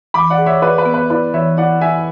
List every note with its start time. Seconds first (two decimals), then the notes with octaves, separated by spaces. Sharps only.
0.14 E3 B5 D6
0.30 D5 F#5
0.38 G#4
0.46 C#5 E5
0.62 G#4 B4 D5
0.78 B4
0.86 B3
0.94 B4
1.10 E4 B4 D5
1.34 E3 C#5 E5
1.57 E4 D5 F#5
1.81 E4 E5 G#5